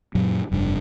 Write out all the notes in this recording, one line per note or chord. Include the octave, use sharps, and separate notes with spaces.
F#2 A#2 F#3
F1 G2 D4